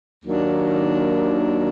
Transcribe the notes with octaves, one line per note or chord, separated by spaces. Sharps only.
D#2 D#3 F#3 A#3 D4